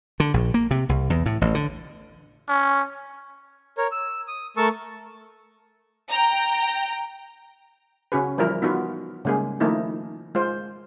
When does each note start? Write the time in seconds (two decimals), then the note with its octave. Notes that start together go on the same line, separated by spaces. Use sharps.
0.20 D3
0.34 A#1
0.54 A#3
0.71 C3
0.89 C2
1.10 E2
1.26 A2
1.41 A1
1.55 D3
2.49 C#4
3.78 A#4 C#5
3.92 E6
4.28 D#6
4.57 A3 A#4 A5 C#6 E6
6.10 G5 A#5
8.12 C#3 C#4 F#4 G#4 B4
8.38 E3 F3 G3 E4 F4 A#4
8.62 B3 D#4 F4 F#4 B4
9.25 C#3 G3 G#3 A#3 G#4
9.60 D#3 F3 A3 A#3 D#4 E4
10.35 G#3 F4 C5